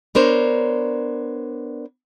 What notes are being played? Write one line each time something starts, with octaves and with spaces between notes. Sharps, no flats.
B3 D4 A#4 C5 C#5